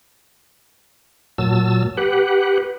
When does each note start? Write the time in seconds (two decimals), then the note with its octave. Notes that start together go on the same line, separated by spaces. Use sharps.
1.38 A#2 F#3 A5 E6
1.97 G4 B4 F#5